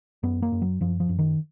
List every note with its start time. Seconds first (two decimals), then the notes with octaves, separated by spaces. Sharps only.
0.23 F#2 B3
0.42 A#3
0.52 F#2
0.62 F#3
0.81 F#2 F3
1.00 F3
1.09 F#2
1.19 D#3